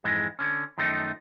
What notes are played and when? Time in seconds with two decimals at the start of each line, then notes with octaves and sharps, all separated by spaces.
0.04 F2 G#2 E3 G#3
0.39 D3 C#4
0.78 F#2 D#3 F3 A3 D#4